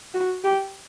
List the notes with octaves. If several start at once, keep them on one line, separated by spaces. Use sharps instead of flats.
F#4
G4